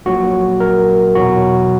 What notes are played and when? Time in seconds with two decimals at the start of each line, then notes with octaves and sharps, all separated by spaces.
0.06 A#1 A#2 F#3 F#4
0.60 A#4
1.15 E2 B2 F#3 F#4